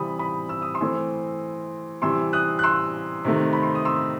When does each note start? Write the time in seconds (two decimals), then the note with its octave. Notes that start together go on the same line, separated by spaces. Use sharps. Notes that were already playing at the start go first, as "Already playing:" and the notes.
Already playing: C3 E3 G3 C4 B5 D#6
0.19 B5 D#6
0.49 E6
0.62 D#6
0.75 C6 E6
0.81 E3 A3 C4
2.02 C3 E3 G3 C6 E6
2.33 D#6 F#6
2.59 F#6
2.63 C6 E6
3.25 C3 D#3 A3
3.53 B5
3.63 C6
3.75 D#6
3.85 C6 E6